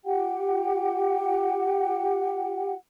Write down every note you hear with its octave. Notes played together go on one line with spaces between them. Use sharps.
F4 G4 F#5 G5